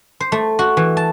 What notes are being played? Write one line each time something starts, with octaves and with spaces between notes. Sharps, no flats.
C5
A3
F#4
E3
A5